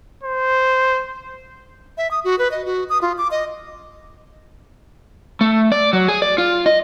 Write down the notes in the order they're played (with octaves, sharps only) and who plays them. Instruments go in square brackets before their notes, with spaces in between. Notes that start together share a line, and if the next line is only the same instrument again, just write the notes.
[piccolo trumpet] C5
[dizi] E5
D#6
F#4
B4
D#5
F#4
D#6
F4
D6
D#5
[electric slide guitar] A3
D5
F#3
G#4
D5
F4
D#5